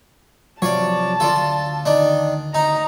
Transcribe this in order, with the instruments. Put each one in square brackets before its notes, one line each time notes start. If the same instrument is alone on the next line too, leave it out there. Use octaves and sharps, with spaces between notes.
[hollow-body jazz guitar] C3 F3 F#3 [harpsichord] C#5 D5 [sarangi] A5
[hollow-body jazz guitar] D2 D5 [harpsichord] F4 A4
[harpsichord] D#3 D4
[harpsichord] D#4 [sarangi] A#5